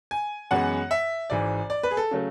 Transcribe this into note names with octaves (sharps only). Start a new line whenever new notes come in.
G#5
F#2 E3 G#3 B3 F#5
E5
G#1 G#2 E3 D5
D5
B4
G#4
A4
C#3 F#3 A3